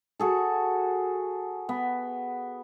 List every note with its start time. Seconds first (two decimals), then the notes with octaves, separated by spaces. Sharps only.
0.19 F#4 G#4 A4
1.69 B3